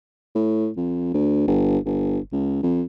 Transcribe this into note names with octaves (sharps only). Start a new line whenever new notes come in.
A2
F2
D2
G1
G1
C#2
F2